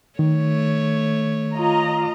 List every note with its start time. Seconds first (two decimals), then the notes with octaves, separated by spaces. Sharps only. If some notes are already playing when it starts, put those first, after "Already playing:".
0.19 D#3 A3 C#5
1.54 F4 D#5 A#5